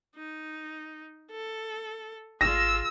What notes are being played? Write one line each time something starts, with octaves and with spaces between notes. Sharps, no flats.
D#4
A4
G#1 F4 G#4 E6 A#6